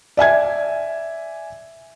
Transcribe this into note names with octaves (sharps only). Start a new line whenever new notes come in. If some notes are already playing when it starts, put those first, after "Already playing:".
D5 E5 G#5 G#6